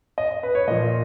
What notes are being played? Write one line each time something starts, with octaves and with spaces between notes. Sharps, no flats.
D#5
B4
C#5
A#2 F3 D#5